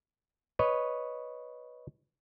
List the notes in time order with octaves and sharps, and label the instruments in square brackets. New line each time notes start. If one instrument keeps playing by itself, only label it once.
[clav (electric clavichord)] B4 C#5 D#5